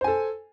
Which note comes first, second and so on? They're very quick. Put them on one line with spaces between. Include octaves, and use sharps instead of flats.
C5 G#5 A4